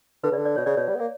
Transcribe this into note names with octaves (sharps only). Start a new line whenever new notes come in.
D3 B4
C#3 D5
D3
D5
B2 C#5
C#3 D5
B2 C#5
G3
B3
A#3